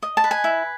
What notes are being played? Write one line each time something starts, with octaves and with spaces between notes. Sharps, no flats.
D#5
A5
B4
G#5
E4